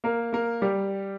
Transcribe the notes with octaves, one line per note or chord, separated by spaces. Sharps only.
A#3 A#4
A#3 A#4
G3 G4